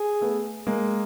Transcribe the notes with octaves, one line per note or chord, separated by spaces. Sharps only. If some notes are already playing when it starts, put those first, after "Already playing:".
Already playing: G#4
A3 B3
G#3 A#3